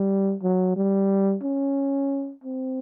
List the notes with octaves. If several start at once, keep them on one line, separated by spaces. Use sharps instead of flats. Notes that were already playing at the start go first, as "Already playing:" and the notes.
Already playing: G3
F#3
G3
C#4
C4